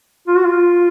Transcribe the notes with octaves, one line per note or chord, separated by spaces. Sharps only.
F4
F#4
F4